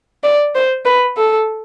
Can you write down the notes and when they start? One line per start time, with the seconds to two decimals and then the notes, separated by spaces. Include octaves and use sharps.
0.24 D5
0.55 C5
0.85 B4
1.17 A4